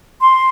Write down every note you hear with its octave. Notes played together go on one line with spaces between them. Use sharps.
C6